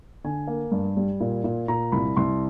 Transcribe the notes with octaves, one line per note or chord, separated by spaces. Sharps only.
D3 G#5
A#3
G2
G3
A#2
A#2
A#2 A#5
C2 B5
C2 C6